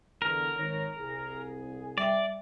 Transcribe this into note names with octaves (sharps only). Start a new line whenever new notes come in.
E2 D3 A#4
G#1 D#3 C#5
C2 G#4
G3 D5 E5 G5